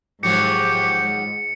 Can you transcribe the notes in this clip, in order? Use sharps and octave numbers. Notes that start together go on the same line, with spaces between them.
G#2 D#3 F3 F#3 G4 C#7